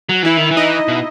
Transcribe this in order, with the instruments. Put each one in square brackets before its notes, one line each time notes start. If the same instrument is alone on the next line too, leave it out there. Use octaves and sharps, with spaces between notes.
[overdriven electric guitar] F#3
[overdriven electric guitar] E3 [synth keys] E4 E5
[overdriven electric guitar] D#3
E3
[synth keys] D#4 D#5
[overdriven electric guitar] B2